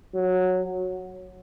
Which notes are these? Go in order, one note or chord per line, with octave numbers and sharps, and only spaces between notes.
F#3